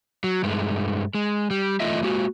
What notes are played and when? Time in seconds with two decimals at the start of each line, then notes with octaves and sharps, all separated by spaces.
0.24 F#3
0.43 G2 G#3 A3
1.14 G#3
1.51 G3
1.80 E2 A3 F4 D#5 E5
2.03 G#3 A#3 F#4